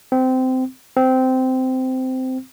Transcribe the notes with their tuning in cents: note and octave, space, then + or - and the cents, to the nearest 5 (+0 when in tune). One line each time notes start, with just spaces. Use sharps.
C4 -20
C4 -15